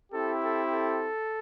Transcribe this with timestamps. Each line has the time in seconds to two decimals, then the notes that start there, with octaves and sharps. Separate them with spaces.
0.12 C4 E4 G4 A4
0.43 A4
0.72 A4